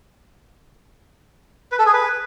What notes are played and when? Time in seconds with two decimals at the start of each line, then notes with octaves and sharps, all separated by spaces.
1.72 B4
1.79 A4
1.86 G#4
1.93 B4